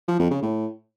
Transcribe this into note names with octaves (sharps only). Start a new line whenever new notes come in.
F3
F2
C#3
A2